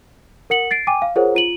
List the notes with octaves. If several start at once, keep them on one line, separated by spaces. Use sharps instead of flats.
A#4 F#5 C#7 F#7
A6 C7 D7
G5 G#5 D6 D#7
F5
F4 G#4 A#4 C5 C#5 F#5
F4 D#7 F#7